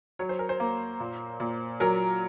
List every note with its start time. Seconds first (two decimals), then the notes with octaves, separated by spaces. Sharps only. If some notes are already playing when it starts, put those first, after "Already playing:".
0.19 F#3 C#5
0.29 C5
0.39 A#4
0.49 C5
0.60 A#3
1.00 A#2
1.40 A#2
1.80 F#3 A#4